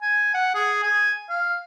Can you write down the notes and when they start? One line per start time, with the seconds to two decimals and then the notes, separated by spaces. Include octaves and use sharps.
0.02 G#5
0.34 F#5
0.55 G#4
0.83 G#5
1.30 F5